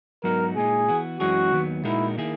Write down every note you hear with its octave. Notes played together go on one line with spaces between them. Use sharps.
G#2 F#3 B3 D#4 F#4 A#4
A#2 G#3 D#4 G#4
E3 B3 F#4
F#2 E3 G#3 C#4 F#4 G#4
D#2 D#3 F#3 B3
A#2 G#3 D#4 E4 F#4 A#4
D#3 A#3 E4 G#4